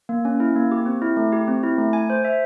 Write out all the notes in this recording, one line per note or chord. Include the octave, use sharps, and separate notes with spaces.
A#3
C#4
E4
A#3
G4
C4
E4
A3
G4
C4
E4
A3
G#5
C5
E5